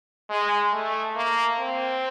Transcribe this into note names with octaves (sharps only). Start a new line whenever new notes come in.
G#3
A3
A#3
C4